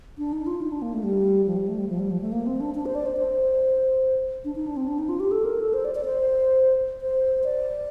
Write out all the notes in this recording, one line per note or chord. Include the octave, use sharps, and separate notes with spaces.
D4
D#4
F4
D#4
D4
A#3
A3
G3
F3
G3
A3
G3
F3
G3
F3
A3
A#3
C4
D4
D4
C5
D5
C5
C5
D4
D#4
D4
C4
D4
D#4
F4
G4
A4
A#4
A4
C5
D5
D5
C5
C5
D5